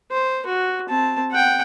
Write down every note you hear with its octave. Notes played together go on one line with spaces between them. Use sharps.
C5
F#4
C4 A5
F#5 G5